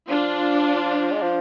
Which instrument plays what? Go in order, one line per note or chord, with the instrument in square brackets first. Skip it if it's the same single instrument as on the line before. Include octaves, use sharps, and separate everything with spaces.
[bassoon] F3 [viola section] D4 F4
[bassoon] G#3
F3